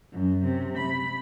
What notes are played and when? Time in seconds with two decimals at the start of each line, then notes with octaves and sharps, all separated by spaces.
0.12 F#2
0.43 C3
0.77 B5